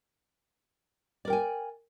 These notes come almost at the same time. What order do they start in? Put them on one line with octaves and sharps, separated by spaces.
D5 A#4 G5 G#5